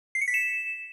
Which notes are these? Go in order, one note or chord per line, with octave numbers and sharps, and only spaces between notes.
C7
C#7
B6
E7